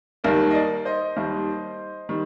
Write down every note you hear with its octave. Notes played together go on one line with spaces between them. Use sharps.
D#2 D#3 G3 A#4 D5
D#5
A#4 D5
C5 D#5
D#2 D#3 G3
D#3 G3